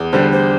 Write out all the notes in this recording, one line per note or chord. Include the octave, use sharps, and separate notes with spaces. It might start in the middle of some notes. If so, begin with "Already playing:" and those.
Already playing: E2
D3 G3 C5
C5